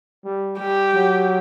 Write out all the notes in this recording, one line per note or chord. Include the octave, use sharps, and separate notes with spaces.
G3
G3 G4
F#3